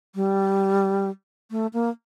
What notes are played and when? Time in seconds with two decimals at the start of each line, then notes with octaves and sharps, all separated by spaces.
0.15 G3
1.51 A3
1.73 A#3